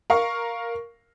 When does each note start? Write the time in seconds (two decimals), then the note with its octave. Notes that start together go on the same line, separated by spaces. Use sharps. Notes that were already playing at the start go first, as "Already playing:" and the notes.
0.10 A#4 F5 C#6